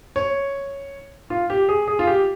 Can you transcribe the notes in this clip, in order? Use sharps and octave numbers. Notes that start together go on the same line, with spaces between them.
C#5
F4
G4
G#4
G#4
F4
G4